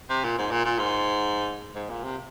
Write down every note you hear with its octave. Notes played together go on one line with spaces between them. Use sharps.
C3
A#2
G#2
A#2
A#2
G#2
G#2
A#2
C3